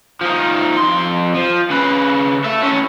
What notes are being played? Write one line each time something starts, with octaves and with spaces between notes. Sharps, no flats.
F3 D#4
F2 C6
F3
C#3 B4
A4 E5
A2 C#4